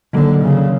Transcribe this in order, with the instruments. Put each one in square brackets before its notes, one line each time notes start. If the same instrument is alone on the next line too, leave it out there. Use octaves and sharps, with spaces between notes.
[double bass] D3 [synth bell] D#3 F#3 A#3
[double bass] C#3